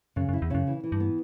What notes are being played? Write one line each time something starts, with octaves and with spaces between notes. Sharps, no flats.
F#2 C#3
F#2
E4
E2
F#2 C#3
E3
E3
G2
B3